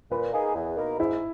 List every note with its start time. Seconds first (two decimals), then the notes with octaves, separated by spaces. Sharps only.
0.11 A#2 B4
0.33 A#3 D#4 G#4
0.55 E2
0.77 B2 A#3 D#4 A#4
0.99 G#2 E4